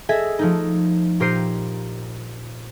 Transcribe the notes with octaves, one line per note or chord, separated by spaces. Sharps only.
G#4 A4 D#5 E5 G#5
F3 A3 D#4
A#2 G4 A#4 C5 C7 D#7